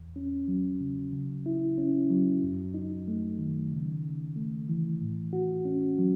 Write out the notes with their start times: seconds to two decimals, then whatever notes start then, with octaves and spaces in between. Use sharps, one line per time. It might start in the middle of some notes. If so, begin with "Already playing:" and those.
Already playing: E2
0.16 C#4
0.48 F#3
0.80 C#3
1.13 C#3
1.46 E4
1.78 C#4
2.10 F#3
2.43 F#2
2.74 D#4
3.08 A3
3.39 D#3
3.72 C#3
4.05 C#3
4.36 A3
4.69 E3
5.02 A2
5.33 F#4
5.65 C#4
5.98 F#3